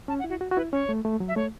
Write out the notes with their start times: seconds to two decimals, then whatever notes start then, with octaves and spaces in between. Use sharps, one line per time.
0.08 C#4 A5
0.19 F#5
0.24 E4
0.30 F#4
0.41 F#4
0.51 F#4
0.57 E4 B4
0.72 C#4 C#5
0.89 A3
1.05 A3
1.20 F#3
1.28 E5
1.36 A3 C#5